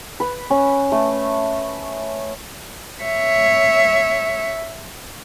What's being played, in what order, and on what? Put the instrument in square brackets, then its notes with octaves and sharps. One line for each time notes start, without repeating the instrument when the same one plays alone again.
[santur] B4
C#4
A3
[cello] C#5 E5